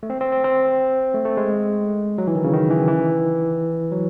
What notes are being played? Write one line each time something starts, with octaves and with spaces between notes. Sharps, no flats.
A3
C4
C4
C4
C4
A3
A3
G#3
F#3
E3
D#3
C#3
D#3
E3
E3
F#3